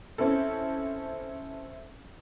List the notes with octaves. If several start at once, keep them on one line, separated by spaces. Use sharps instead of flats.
C4 C#4 E4 A4